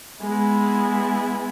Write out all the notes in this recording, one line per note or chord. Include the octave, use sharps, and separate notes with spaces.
G#3 B3 E4